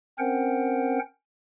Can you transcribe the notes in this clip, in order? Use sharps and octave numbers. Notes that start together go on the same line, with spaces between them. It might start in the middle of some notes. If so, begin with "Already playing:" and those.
C4 C#4 A#4 C5 F#5 G5